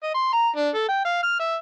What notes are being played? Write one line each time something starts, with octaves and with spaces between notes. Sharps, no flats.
D#5
C6
A#5
D4
A4
G5
F5
F6
E5